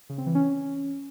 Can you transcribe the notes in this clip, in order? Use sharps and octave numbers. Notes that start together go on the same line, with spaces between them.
C#3
C4
E3
C#4